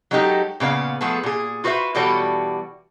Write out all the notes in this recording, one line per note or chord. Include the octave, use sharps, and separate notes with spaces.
F#3 G#3 C#4 D#4 G4 A4
A#2 C#3 B3 D4 F5
F3 A3 B3 G#4 A4
A#2 G#4
F4 F#4 B4 C5 E5
B2 E3 G3 F#4 A4 C#5